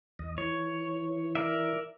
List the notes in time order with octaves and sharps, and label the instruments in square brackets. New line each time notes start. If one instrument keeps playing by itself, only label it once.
[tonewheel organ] E2 D#5
[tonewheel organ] E3 [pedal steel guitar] C#5
[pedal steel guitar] A#4 D5 E5